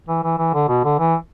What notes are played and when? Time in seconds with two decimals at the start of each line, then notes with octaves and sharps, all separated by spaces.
0.08 E3
0.24 E3
0.38 E3
0.54 D3
0.68 B2
0.84 D3
0.99 E3